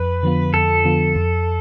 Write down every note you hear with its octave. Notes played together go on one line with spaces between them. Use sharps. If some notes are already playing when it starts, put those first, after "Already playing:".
Already playing: F2 B4
D3 F3 B3 F4
F2 A4
D3 F3 B3 F4
F2